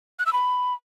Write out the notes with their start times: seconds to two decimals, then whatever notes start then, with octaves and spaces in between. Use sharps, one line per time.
0.19 F#6
0.26 E6
0.33 B5